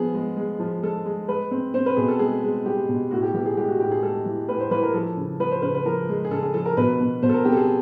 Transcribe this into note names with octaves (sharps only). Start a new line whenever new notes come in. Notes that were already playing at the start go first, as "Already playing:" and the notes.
Already playing: F3 B3 G#4
G#3
G#3
F3
G#3 A4
G#3
G#3 B4
C4
C4 C5
B4
B2 G#4
A4
G#3 G#4
G#3
G#3 G4
B2
A2 F#4
G4
E3 G4
G#4
G#3 G4
F#4
A2 G4
G#4
G#3 A4
E3
A2 B4
C5
E3 B4
A#4
F3 A4
C#3
F3 B4
C5
C#3 B4
B4
F3 A#4
G#3
G#4
C#3 A4
G#4
F3 A4
A#4
B2 B4
B2
B2 C5
A4
A#4
C4 G4
A4
G#4